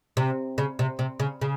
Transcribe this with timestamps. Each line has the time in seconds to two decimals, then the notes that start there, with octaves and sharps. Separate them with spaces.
0.17 C3
0.58 C#3
0.79 C3
0.99 C3
1.20 C#3
1.41 C#3